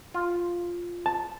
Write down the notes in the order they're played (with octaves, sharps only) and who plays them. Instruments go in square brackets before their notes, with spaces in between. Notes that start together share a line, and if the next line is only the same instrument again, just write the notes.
[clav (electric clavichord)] F4
[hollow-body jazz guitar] A5